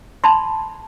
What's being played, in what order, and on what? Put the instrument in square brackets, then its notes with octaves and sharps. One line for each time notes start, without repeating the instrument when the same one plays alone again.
[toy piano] A5 B5 C6